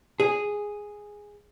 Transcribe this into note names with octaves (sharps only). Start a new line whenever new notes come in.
G#4